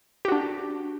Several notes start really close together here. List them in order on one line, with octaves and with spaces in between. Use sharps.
G4 F#4 D4